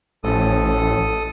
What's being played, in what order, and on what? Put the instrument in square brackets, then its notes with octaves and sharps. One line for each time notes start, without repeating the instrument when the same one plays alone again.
[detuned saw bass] A1 [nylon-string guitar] A2 F3 C#4 [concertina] A4 D#6